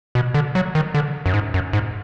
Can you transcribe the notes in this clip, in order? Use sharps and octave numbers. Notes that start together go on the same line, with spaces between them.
B2
D3
F#3
D#3
D3
F#2
G#2
F#2
G#2